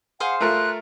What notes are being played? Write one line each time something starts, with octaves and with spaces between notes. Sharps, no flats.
G#4 C5 F5 F#5
A3 F4 A#4 F#6